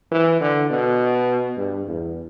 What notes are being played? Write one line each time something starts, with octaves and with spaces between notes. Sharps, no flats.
E3
D3
B2
G2
E2